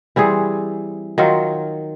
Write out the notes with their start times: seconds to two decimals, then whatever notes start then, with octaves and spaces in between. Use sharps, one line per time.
0.16 E3 G3 C4 G#4
1.18 D#3 F#3 F4